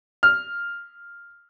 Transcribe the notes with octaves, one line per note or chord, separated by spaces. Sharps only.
F6